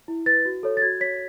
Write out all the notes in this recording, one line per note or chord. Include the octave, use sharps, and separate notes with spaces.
E4
B4 A6
F#4
A4 C#5
A6
F#4 G#6
C#5 B6